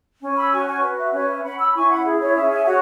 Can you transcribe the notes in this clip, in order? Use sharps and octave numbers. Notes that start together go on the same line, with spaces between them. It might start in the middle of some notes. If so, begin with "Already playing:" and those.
C#4
B5 E6
F#4 G#5 C#6
G#5 C#6
B4
E5
C#4 C#5
E5
C#4 F#5 B5
B5 E6
E4 G#5 C#6
F#5 B5
G#4
C#5
C#4 E5
E5 G#5
F#4 C#5 F#5